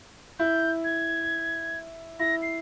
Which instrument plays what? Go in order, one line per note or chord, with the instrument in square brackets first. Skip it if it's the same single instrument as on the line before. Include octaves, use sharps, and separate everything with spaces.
[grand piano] E4 [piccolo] G6
[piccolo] G#6
[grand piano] E4 [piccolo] A#6
[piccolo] C7